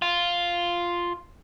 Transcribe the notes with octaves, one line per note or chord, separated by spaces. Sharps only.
F4